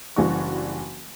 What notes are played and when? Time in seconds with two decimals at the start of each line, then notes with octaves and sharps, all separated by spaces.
0.16 F#1 E3 G3 D4 F#4 C#6